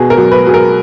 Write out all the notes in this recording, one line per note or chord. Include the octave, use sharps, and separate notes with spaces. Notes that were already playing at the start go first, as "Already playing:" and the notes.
Already playing: B2 G#4
A#4
F#3
B4
F#3 G#4
A#4